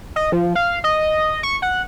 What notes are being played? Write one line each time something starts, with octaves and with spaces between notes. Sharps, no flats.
D#5
F3
F5
D#5
C#6
F#5